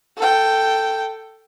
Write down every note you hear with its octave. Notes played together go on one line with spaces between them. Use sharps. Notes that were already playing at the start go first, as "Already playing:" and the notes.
A4 G5